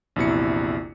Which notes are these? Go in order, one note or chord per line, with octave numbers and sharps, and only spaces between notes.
A#1 E2 C3 E4 F#4 C#7